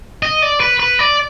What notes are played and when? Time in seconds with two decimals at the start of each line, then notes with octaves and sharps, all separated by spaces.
0.23 D#5
0.42 D5
0.60 B4
0.80 B4
0.99 D5